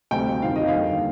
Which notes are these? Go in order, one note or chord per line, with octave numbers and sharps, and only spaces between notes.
D2 C3 G3 G5
F2 C3 D#3 F5
D#5
F5
D#2 D3 G3 A#3